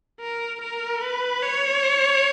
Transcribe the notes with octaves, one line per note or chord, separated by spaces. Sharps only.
A#4
A#4
B4
C#5